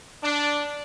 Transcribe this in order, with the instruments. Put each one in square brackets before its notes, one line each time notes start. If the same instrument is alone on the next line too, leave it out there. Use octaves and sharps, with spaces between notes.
[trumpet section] D4